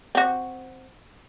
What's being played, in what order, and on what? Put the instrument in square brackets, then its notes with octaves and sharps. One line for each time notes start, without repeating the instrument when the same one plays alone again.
[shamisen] C4 F#4